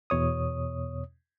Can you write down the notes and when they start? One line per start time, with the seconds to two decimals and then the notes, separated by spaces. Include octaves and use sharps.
0.10 E2 B2 C#5 D#6